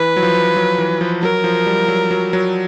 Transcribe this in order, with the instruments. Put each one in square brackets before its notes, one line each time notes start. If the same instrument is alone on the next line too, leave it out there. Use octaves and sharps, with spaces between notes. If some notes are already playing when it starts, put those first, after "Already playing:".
Already playing: [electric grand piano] E3 [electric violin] B4
[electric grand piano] F#3
F3
F#3
E3
F3
[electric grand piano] F#3 [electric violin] A#4
[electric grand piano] F3
G3
F#3
F#3
F#3